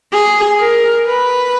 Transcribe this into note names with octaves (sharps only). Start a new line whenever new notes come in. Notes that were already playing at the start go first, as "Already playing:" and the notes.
G#4
A#4
B4